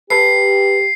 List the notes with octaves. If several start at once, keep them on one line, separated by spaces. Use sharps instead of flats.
G4 A4 B4 C7